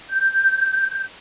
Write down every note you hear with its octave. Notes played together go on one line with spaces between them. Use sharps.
G6